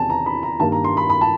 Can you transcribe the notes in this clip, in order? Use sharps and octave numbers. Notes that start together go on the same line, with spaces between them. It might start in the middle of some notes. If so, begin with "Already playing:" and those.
Already playing: E2 C3 D#3 G#5 A5
A#5
B5
A#5
G2 D#3 G3 A#3 A5
A#5
C6
B5
B5
A5